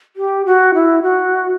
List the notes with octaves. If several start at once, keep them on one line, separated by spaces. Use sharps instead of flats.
G4
F#4
E4
F#4